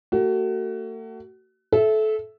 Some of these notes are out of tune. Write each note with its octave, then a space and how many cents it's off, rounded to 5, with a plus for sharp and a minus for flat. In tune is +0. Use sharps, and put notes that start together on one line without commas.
A3 +40 F#4 +30
A4 -25 E5 +0